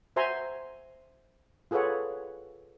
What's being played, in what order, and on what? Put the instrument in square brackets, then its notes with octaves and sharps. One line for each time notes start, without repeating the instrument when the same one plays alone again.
[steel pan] F#4 C5 E5 G#5 A#5 C6
F4 G#4 A4 B4 C#5 F#5